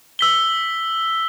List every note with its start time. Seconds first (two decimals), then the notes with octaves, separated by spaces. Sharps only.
0.19 E6 B6 G7